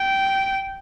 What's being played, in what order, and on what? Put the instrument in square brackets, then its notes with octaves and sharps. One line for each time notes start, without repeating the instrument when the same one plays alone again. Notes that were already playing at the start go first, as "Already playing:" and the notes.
Already playing: [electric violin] G5